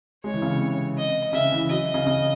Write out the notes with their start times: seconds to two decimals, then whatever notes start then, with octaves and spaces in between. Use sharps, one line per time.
0.24 G#3 C#5
0.34 E3
0.42 C#3
0.51 C3
0.97 D#5
1.33 C#3 E5
1.52 E3
1.70 F#3 D#5
1.94 C#3
2.07 C#3